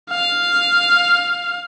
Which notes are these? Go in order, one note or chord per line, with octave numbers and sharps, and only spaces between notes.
F5